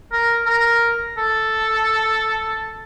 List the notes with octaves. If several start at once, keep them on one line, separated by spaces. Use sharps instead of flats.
A#4
A#4
A4